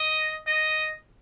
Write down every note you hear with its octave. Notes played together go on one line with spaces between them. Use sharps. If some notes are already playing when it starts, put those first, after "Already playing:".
Already playing: D#5
D#5